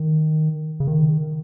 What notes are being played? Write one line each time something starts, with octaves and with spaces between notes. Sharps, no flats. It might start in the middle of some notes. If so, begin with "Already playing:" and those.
Already playing: D#3
C#3
D#3